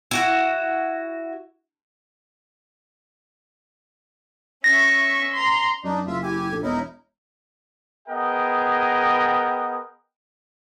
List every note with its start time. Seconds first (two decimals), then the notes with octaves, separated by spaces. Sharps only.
0.11 E4 F#4 F#5
4.64 C#4 E5 C#6 A#6
5.36 A#5 C6
5.84 F#2 D4 D#4
6.07 F#1 F4 E5
6.23 E4 G4 G#5
6.51 A#1 A4
6.63 E1 D#4 E4 A#4 C#5
8.08 B3 G#4 A#4 D#5 G5